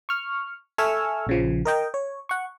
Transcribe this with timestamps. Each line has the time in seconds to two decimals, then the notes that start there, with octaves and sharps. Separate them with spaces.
0.09 C#6 F6
0.78 A4 E5 G#5 C#6 E6 F6
1.27 A#1 C#3 F3
1.65 A#4 D#5 G5
1.94 C#5
2.29 F#5 C#6